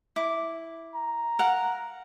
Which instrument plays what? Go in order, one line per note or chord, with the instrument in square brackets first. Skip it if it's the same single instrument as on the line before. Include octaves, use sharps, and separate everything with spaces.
[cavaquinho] E4 D6
[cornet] A#5
[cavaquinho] A#4 F5 F#5